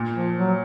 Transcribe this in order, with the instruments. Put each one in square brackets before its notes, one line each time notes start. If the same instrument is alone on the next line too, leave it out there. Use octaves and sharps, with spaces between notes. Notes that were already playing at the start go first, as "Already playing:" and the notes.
Already playing: [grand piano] A#2
[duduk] F3
F#3